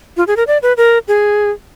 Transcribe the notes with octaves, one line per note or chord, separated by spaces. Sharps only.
F4
G#4
A#4
D5
B4
A#4
G#4